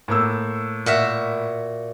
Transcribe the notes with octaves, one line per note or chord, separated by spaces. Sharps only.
A2 A#3 E6
A#2 F#4 E5